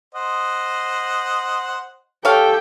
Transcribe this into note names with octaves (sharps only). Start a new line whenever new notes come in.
C5 D#5 F#5
G4 A4 C#5 F5 G5